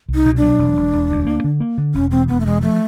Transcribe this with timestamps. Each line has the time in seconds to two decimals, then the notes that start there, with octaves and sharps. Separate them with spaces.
0.09 C2
0.15 D#4
0.26 B2
0.37 F#3 D4
0.59 E1
0.76 E1
0.93 E1
1.11 D2
1.27 A#3
1.44 D3
1.60 A#3
1.78 D3
1.94 E1 C#4
2.11 E1 C4
2.28 E1 B3
2.40 A3
2.46 E1 G#3
2.62 F3 A3